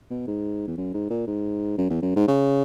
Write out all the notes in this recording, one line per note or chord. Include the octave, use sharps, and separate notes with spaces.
B2
G#2
E2
F#2
G#2
A#2
G#2
F#2
E2
F#2
G#2
C#3